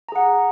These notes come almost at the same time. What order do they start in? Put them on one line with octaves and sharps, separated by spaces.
A#5 G#4 F#5